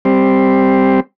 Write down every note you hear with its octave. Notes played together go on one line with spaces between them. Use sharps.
G3 C4